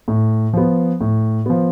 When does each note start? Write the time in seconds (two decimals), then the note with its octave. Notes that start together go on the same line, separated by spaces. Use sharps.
0.08 A2
0.53 F3 B3
1.01 A2
1.46 F3 B3